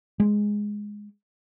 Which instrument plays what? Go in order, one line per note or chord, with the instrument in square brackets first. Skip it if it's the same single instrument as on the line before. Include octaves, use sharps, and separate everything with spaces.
[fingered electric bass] G#3